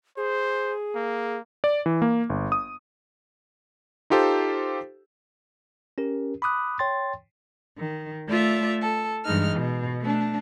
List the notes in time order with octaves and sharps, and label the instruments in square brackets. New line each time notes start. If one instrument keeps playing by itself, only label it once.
[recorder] G#4 [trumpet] C5
[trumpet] A#3
[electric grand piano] D5
E3
A#3
G1
D#6
D#4 F4 G4 A4 C5
[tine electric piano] C#4 G4 A#4
B5 D6 D#6 F#6
C#5 G5 C6 A6
[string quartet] D#3
A3 F4 D5 E5
A4
G2 E3 G#3 D#4 F6
B2
A3 D4